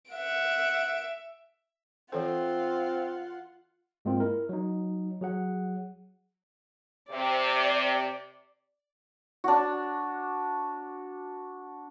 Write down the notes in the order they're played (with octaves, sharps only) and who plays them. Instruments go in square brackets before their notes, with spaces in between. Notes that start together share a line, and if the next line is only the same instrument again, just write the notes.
[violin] E5 D7 [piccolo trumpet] F#5
[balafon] E3 A4 [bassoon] C4 [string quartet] F4 F#5
[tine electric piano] G#2 G#3 A#3 C4 F4
E4 A#4
F#3 D#4
F#3 G#4 F#5
[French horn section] C3 [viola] D5
[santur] D4 F#4